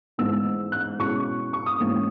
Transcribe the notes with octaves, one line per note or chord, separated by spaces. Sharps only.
G#2 E3 B3 E4 E6
F#6
B2 G#3 C#4 E4 C#6
C#6
D#6
G#2 E3 A#3 C#4